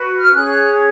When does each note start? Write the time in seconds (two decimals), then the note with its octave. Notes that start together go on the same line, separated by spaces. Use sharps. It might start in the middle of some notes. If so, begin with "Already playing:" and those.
Already playing: F#4 B4
0.18 F6
0.33 C#4 G#4 C#5 F#6